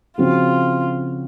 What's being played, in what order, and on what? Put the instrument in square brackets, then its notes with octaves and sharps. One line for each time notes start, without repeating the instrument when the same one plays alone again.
[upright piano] C#3 F3 C4 F#4 [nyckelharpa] F4